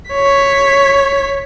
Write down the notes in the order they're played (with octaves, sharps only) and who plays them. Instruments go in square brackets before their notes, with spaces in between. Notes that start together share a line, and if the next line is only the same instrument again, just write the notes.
[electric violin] C#5 B6